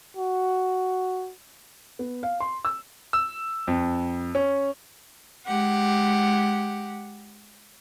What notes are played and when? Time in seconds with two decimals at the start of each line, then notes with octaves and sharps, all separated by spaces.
0.17 F#4
1.99 B3
2.23 F5
2.40 C6
2.65 E6
3.13 E6
3.68 F2
4.35 C#4
5.46 G#3 G4 F#5